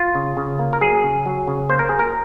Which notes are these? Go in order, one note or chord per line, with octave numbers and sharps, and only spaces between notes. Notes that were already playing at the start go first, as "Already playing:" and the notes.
Already playing: F4
C#3
C#3
A#3
A#4
F#3 G#4
C#3
F#3
C#3
A#3 C5
A#4
F#3 G#4
A#4